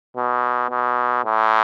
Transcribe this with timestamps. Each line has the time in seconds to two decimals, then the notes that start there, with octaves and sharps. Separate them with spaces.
0.17 B2
0.70 B2
1.25 A2